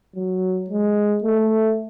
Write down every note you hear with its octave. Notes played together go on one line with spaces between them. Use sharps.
F#3
G#3
A3